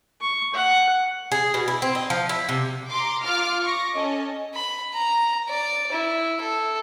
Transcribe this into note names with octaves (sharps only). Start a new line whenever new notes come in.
C#6
F#5
G#4
B2
E4
C4
D#4
F3
E4
C3
A#5 C6 D6
F4 D6 F6
C#6 D6 A#6
C#4 A4 D#5
B5
A#5
D5
E4
A4